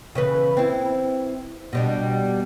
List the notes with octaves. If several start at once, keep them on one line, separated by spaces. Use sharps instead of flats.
C#3 E3 B4
C4 E4
B2 G3 D4